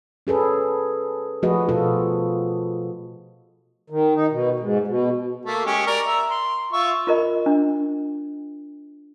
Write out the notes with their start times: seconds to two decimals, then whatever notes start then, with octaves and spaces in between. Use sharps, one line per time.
0.27 C#4 G#4 A4 B4
1.43 F3 A3 F#4 G#4 B4 D#5
1.69 B2 F4 A4
3.90 D#3
4.15 D#4
4.32 B2
4.60 G#2
4.87 B2
5.45 A3 A#3
5.66 G#3 C#4 G4
5.87 A#4 D5 C#6
6.06 E5 A#5
6.30 C6
6.72 F4 E5 C#6
7.07 F4 A#4 D#5
7.46 D4